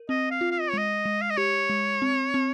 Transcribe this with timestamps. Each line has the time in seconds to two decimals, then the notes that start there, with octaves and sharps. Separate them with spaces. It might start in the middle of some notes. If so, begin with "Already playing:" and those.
Already playing: A#4
0.09 C4 D#5
0.31 F5
0.41 F4
0.51 F5
0.61 D#5
0.70 C#5
0.74 G#3 D#5
1.05 G#3
1.22 F5
1.30 D#5
1.37 G4 C#5
1.70 G#3
2.02 C4
2.34 C4